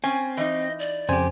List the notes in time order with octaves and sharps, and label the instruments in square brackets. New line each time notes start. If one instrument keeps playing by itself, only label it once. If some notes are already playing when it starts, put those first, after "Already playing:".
[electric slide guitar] C4 [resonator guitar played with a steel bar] C#4 G#5
[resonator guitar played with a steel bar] E3 D#4 [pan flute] D#5
[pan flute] D5
[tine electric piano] F2 C5 G#5 [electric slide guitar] C#3 G4